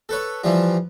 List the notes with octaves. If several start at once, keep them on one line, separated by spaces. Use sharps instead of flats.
A4 B4 C#5
E3 F3 G3 F4